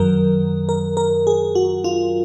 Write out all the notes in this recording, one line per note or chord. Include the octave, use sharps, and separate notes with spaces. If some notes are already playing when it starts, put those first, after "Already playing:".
Already playing: F#2 D#3 F#3 A#4
A#4
A#4
G#4
F#4
F4